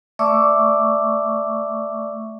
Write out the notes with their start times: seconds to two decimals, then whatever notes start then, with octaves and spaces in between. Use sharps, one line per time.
0.19 A3 D5 E5 C#6 D6 E6